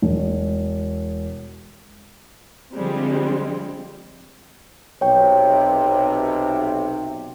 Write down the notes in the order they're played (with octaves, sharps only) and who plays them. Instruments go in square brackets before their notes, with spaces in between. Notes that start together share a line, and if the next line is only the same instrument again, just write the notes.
[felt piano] E1
[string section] D3 F3 G3 G#3 C4
[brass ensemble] B1 C3 [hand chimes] C#5 G5